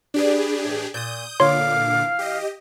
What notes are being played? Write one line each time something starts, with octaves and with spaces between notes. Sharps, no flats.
D4 G4 G#4 B4 D5
A2 E3
A#2 D#6 G6
A#2 D3 B3 C#5 F5 C6 D6
E3
G4 D#5